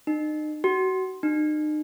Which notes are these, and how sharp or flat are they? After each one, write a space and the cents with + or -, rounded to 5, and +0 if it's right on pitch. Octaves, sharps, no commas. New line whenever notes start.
D#4 -35
F#4 +25
D#4 -40